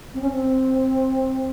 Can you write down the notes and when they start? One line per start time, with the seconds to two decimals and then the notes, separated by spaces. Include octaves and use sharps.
0.13 C4
0.21 C#4
0.30 C4